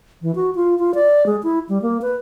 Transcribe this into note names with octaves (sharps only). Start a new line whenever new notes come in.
E3
F#4
F4
F4
D5
G#3
E4
G3
A#3
B4